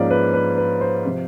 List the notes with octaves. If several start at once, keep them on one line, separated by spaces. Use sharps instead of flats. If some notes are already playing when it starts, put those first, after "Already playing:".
Already playing: G#2 F3 A#3 C#4 F4 C5 D5
B4
B4
B4
C5
C3 F3